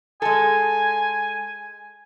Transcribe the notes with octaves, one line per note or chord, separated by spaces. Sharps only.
G#3 A4 G#5